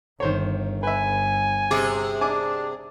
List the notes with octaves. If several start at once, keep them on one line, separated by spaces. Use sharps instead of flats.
G1 D#3 C5 C#5
B4 E5 G#5
C3 G#4 D6
D4 G#5 D6